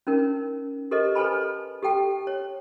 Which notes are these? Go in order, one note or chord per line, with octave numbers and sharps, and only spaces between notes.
C#4 D#4 A#4
G4 A4 A#4 C5 D#5
A4 B4 C5 G#5 A5 B5
G4 A4 G5 A5
C#5